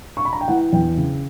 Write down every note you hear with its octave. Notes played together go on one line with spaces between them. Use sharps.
C#6
B5
A#5
G5
E3 F#5
E2 G5
C#3